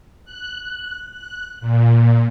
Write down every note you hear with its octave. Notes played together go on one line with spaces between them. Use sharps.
F#6
F#6
A#2